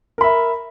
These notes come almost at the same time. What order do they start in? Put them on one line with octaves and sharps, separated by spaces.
A#4 B5 E5